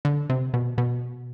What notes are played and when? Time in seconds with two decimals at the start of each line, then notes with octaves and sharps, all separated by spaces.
0.05 D3
0.30 C3
0.54 B2
0.78 B2